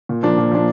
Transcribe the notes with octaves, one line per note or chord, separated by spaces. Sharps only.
A#2
F3 A#3 D4
A#2
F3 A#3 D4